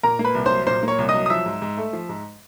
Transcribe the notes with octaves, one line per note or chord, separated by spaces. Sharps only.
A#2 A#4 A#5
A#3
B4 B5
C2
F#3 C5 C6
A#2 C5 C6
A#3
C#5 C#6
C2
D#5 D#6
F#3
D#6
F3 E5 E6
G#2
G#2
A3
F3
G#2